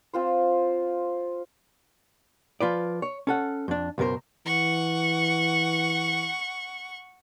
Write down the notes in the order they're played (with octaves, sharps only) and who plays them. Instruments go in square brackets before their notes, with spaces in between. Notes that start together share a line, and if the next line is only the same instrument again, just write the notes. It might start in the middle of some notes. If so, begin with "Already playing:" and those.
[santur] C4 F4 C5
[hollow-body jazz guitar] F3 F4 B4 D5
C#5
C#4 A4 F#5
F2 D4
C#2 F#2 B2 A#4 C5
[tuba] E3 [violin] F#5 C#6